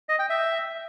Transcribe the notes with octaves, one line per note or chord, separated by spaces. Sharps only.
D#5
G5
E5